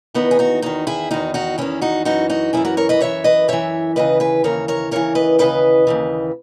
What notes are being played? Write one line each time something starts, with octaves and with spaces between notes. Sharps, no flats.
E2 D#3 B3 D#4
G#4
D#4 F#4
E2 D#3 D#4 F#4
E4 G#4
E2 D#3 D#4 F#4
D#4 F#4
E2 D#3 C#4 E4
D#4 F#4
F#2 E3 D#4 F#4
D#4 F#4
F#2 E3 E4 G#4
F#4 A#4
A#4 C#5
B4 D#5
F#2 E3 C#5 E5
B4 D#5
F#2 E3 C#5 E5
D#2 C#3 E3 B4 D#5
G#4 B4
D#2 C#3 E3 A#4 C#5
A#4 C#5
D#2 C#3 E3 A#4 C#5
B4 D#5
D#2 C#3 E3 B4 D#5
D#2 C#3 E3